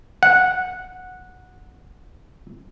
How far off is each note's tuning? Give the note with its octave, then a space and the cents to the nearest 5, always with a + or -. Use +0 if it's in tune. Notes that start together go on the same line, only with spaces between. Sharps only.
F#5 -10